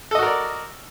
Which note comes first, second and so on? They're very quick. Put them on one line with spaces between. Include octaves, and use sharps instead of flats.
A4 D#5 F#4 A#4 D5